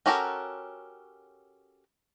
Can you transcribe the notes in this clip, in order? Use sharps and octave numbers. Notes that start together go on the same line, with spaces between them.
C#4 F#4 G4 A4 A#4